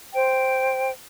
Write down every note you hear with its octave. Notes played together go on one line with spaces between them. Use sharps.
C5 G5